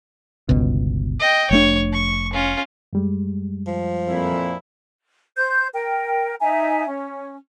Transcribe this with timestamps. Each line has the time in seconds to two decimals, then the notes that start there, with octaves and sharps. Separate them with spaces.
0.49 G1 C#2 B2
1.19 D#5 G5
1.51 F1 A3 D4 C#5
1.93 C#6
2.33 C#4 F4
2.93 F#2 G3 G#3
3.67 F3
4.06 F2 A#2 E4
5.37 C5 G6
5.73 A#4 G5
6.40 D#4 E5 G#5 A#5
6.87 C#4